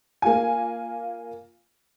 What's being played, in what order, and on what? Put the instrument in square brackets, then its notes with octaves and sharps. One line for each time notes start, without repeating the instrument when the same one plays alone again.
[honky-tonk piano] A#3 F4 G#5